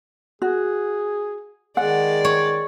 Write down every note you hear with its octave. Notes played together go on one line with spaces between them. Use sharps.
F#4 G#4
D#3 G#3 D5 F#5
C#5